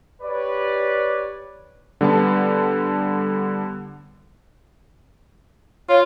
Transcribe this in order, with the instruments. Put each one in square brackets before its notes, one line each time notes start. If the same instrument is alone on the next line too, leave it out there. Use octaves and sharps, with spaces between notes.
[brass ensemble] G4 B4 C#5 D5
[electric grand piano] D3 G3 B3 A5
[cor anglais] F4 [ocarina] C#5